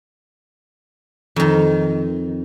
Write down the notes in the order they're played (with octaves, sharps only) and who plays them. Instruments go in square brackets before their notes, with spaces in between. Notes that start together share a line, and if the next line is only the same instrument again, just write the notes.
[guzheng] F2 D#3